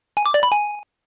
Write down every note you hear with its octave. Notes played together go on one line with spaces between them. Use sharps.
G#5
D6
D5
B5
G#5